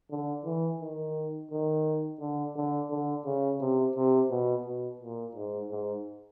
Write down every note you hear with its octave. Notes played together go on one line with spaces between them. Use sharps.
D3
E3
D#3
D#3
D3
D3
D3
C#3
C3
C3
B2
B2
A#2
G#2
G#2